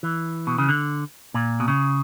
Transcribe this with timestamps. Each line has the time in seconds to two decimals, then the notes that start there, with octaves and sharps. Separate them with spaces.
0.03 E3
0.47 B2
0.58 C#3
0.69 D3
1.34 A#2
1.60 B2
1.68 C#3